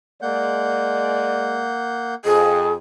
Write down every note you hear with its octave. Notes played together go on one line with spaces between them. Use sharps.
G#3 A#3 D5 F#5 G6
F2 G#4 D#5